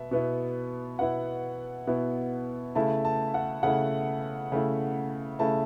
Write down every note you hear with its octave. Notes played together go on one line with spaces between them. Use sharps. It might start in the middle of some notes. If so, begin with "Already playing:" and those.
Already playing: B2 B3 E5
B2 B3 E4
B2 B3 E4 F#5
B2 B3 E4
C#3 A3 E4 A5
A5
F#5
C#3 A3 E4 F#5
C#3 A3 E4
C#3 A3 E4 A5